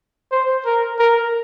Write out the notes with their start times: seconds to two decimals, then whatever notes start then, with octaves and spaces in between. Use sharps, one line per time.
0.32 C5
0.65 A#4
0.99 A#4